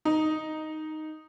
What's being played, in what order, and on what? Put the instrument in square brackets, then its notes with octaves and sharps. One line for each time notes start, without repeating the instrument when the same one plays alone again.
[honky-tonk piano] D#4